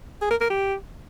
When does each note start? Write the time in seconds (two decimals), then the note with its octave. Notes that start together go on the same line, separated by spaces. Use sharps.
0.21 G#4
0.31 A#4
0.41 A#4
0.50 G4